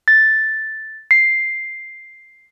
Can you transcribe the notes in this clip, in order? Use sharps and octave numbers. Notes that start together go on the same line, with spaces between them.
A6
C7